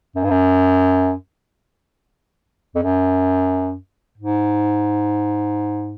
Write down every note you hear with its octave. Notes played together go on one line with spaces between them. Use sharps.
F#2
G2
F#2
F2
F#2
G#2